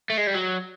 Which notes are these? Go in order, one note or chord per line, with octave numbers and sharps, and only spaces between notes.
A3
G#3
G3
F#3